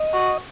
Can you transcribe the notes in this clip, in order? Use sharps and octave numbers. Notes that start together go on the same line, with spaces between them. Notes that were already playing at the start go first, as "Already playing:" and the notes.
Already playing: D#5
F#4